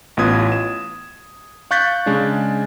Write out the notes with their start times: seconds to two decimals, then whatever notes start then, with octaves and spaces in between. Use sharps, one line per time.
0.17 A1 B3 F4 B4 D#6 G#6
0.52 E7
1.71 F5 C#6 F#6 G6 A6 B6
2.06 C#3 G#3 D4